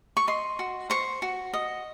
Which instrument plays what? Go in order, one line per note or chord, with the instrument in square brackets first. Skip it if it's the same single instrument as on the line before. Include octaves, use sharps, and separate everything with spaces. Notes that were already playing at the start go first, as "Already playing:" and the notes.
[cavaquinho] C#6
D#5 C6
F#4
C5 C#6
F#4
D#5